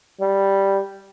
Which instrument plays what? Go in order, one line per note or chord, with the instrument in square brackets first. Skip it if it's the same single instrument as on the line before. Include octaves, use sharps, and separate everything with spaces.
[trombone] G3